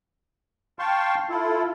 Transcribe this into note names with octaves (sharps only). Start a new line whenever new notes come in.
F5 G5 A5 C6 C#6
E4 F4 A4